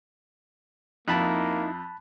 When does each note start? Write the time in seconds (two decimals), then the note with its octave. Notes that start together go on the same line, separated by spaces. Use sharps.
1.08 F2 A#3 D#4 E4 A5 B5 F#6